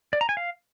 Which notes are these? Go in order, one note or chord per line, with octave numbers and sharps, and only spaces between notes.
D5
A#5
G#5
F5